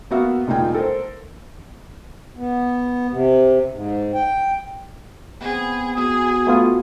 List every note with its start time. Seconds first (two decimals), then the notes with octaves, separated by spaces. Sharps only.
0.11 A#3 B3 F#4 E5 F5
0.48 E1 A#3 D#4 F4 G5 G#5
0.74 A4 A#4 C5
2.36 B3
3.10 C3
3.71 G#2
4.14 G5
5.41 B3 C4 G#4
5.97 B2 G#4 D#6
6.47 A3 B3 F4 C#6